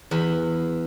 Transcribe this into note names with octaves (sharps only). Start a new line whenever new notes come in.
E2 B5